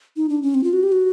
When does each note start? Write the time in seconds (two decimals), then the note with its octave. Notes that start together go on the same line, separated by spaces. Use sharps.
0.17 D#4
0.29 D4
0.42 C#4
0.54 C4
0.64 F4
0.73 F#4
0.83 G4
0.92 F#4